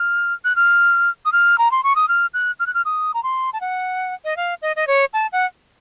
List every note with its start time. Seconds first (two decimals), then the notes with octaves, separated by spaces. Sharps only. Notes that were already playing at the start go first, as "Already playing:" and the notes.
Already playing: F6
0.45 F#6
0.56 F6
1.25 D#6
1.33 F6
1.58 A#5
1.72 C6
1.84 C#6
1.96 D#6
2.09 F6
2.34 F#6
2.60 F6
2.67 F#6
2.74 F6
2.85 D#6
3.14 A#5
3.23 C6
3.53 A5
3.61 F#5
4.25 D#5
4.37 F5
4.62 D#5
4.76 D#5
4.87 C#5
5.13 A5
5.32 F#5